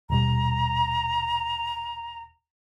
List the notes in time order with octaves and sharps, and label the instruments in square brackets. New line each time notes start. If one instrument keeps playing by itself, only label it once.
[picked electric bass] D#1 B2 G3 [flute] A#5